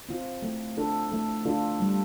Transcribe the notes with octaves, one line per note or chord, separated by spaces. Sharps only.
C4 F4
A3
D4 F4 A4
A3
D4 F4 A4
G3